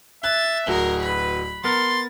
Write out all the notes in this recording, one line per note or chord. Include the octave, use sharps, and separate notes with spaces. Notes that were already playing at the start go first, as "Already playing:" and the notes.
E5 F#6 A6
D1 F#4 G#4 A#4
B4 B5
B3 A#4 C6 A6